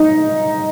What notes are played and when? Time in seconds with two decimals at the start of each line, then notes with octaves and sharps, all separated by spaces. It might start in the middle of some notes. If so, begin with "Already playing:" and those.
Already playing: D#4